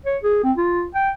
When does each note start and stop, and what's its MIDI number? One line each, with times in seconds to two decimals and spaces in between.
0.06 0.18 73
0.23 0.39 68
0.44 0.52 60
0.57 0.86 65
0.95 1.10 79